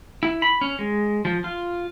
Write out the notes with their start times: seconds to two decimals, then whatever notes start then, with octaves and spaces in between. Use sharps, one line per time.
0.23 E4
0.42 B5
0.61 C#4
0.79 G#3
1.25 F3
1.44 F4